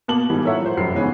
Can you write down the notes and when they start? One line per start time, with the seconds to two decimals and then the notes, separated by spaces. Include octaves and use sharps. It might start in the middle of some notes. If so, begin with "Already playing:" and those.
0.08 B2 A#3 A5 D6 F#7
0.30 G#2 B2 E3 G3
0.44 F4 A4 A#4 C#5 E5 F#5
0.62 F3 C5
0.77 F1 F#2 C7
0.95 G#2 C#3 E3 B3 C#4